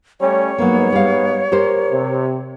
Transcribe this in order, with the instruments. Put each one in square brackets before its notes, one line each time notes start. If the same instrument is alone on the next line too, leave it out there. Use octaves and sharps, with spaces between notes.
[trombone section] G3 A3 C#4 [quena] C#5
[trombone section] G#2 B3 [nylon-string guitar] F#3 A#3
[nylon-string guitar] G3 F5
G4 A#4 C5
[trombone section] C3